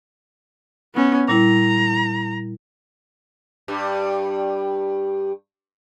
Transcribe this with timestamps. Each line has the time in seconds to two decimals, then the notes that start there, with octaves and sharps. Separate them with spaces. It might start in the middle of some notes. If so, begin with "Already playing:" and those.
0.94 B3 C#4
1.28 A#2 G3 E4 A#5
3.68 G2 G3